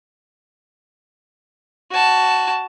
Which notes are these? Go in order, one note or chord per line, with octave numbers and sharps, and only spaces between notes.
F#4 A5